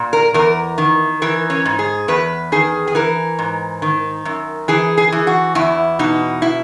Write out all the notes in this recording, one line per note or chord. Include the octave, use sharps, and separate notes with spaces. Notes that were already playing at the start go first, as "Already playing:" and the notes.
Already playing: A#2
A#4
E2 A#4
D#3
E3 A#4
C#4
G#2
G#4
E2 B4
D#3 G#4
G#4
E3 A#4
G#2
D#3
F#2
E3 G#4
G#4
E3
F#4
E2 E4
B2 D#4
E4